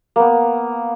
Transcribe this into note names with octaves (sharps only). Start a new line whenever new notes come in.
A#3 B3